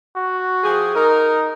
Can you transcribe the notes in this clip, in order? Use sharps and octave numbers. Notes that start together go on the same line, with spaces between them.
F#4
F3 G4 G#4
D#4 A#4